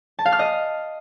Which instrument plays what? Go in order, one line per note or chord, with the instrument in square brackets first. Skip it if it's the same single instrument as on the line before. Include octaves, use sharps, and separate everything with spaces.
[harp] A5
F5
F6
D#5